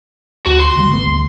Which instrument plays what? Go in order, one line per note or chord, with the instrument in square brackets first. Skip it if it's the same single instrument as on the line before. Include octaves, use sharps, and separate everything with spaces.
[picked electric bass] D2 [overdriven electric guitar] F#4
[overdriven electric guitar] C6
[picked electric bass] D2 D#3 G3
G#1 A3 B3
D2